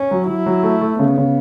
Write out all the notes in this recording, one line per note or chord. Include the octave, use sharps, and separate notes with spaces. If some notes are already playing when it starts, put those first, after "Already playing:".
Already playing: C#4
F#3
F#3 E4
F#3
A3
A3
C#3 B3
C#3